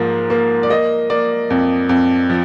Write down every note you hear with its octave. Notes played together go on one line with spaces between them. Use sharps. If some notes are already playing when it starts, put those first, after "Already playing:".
Already playing: G#2 F3 A#3
A#3
D5
A#3 D#5
A#3 D5
F2
F2
F3